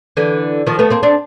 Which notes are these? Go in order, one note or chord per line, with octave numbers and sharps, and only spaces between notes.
D3 E3
D#3 F3
A3 B3
A#3 C4
C4 D4